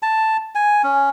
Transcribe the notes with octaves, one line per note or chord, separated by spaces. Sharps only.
A5
G#5
C#4